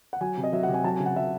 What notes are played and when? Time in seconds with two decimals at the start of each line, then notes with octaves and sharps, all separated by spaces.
0.13 F#5
0.21 F#3 G#5
0.37 C3
0.44 D#5
0.53 F#3 E5
0.63 F#5
0.69 C3
0.74 G#5
0.84 F#3 A5
0.94 G#5
1.00 C#3
1.06 F#5
1.16 F#3 E5